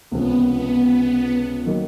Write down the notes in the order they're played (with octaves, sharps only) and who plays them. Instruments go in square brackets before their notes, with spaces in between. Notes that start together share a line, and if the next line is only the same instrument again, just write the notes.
[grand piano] C#2 C3 F3 A#3 C#4 [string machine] B3
[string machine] B3
[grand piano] D#3 F#3 A#3 D#4